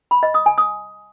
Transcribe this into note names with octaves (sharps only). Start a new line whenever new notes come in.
B5
D#5
D#6
G#5
D#6